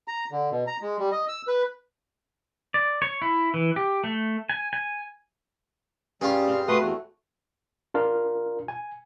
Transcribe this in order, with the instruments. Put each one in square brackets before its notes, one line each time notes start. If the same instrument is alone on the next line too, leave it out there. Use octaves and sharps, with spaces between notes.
[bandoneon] A#5
D3
B2
A#5
G#3
G3
D#5
E6
B4
[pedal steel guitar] D5
C#5
E4
E3
G4
A3
G#5
G#5
[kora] G2 G4 [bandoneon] G3 [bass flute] C#4 [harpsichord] F4 G#4
[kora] C4 F5
[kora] A3 [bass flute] F#4 [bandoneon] B4 C6 D#6
[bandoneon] E2
[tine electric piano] D4 F4 A#4
G#5